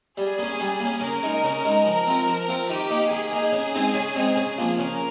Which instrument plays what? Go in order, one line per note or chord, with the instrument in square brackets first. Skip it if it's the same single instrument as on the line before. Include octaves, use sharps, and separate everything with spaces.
[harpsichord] G3 [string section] G#4
[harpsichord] A#3 C#4
G3
A#3
C#4
[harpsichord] C#3 [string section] A#4
[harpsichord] G#3 D#4
C#3
G#3 D#4
[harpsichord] F3 [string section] A#4
[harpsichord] C4 F4
F3
C4 F4
[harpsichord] D#3 [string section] G4
[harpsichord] A#3 D#4
[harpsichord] D#3 [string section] G#4
[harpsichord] A#3 D#4
C#3
G#3 C4 D#4
C#3
G#3 C4 D#4
C#3
F3 A#3 F4
[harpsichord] C#3 [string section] A#4